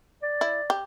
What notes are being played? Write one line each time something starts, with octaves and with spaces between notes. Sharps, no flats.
D5
E4
G4